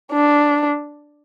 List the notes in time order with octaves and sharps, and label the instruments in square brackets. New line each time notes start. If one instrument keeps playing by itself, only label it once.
[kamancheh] D4